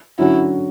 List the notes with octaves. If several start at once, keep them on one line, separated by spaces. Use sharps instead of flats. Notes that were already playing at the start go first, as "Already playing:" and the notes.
D3 F#3 C#4 E4 F#4